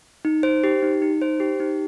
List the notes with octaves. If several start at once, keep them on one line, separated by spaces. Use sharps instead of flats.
D#4
C5
G4
D#4
D#4
C5
G4
D#4